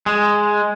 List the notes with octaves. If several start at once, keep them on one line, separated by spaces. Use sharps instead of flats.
G#3